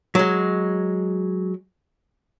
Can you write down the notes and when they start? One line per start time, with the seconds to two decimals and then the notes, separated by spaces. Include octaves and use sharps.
0.15 F#3 G#3